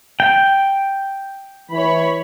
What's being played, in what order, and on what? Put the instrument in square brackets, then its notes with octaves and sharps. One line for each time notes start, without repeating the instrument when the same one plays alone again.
[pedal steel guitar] G5
[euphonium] E3 [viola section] C#5 B5